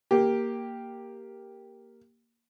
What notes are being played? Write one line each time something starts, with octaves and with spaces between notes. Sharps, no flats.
A#3 G4